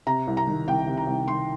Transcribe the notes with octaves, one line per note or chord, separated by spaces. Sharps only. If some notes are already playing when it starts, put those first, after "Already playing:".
C3 A#5
C2
A#5
D#3
C2 G5
C3
A#5
C2
D#3 C6